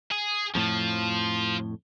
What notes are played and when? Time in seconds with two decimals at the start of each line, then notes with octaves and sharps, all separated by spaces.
0.12 G#4
0.55 F2 A2 F3